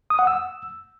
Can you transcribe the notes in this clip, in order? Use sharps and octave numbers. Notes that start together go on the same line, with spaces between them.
D#6
F#5
E6